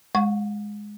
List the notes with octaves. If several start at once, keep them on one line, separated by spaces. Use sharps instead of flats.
G#3 F#5 C#6